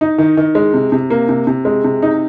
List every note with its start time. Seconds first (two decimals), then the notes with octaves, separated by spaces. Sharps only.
0.01 D#4
0.18 D#3
0.37 D#3
0.55 G#3
0.74 C3
0.92 C3
1.10 A#3
1.29 C3
1.47 C3
1.65 G#3
1.84 C3
2.02 D#4